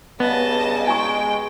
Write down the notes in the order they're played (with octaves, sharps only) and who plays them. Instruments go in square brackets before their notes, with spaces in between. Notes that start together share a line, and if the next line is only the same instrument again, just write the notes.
[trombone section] G2 C#3 [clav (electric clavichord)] B3 [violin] D#5 A5
[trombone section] G#3 [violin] G5 [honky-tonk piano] G#5 A#5 C#6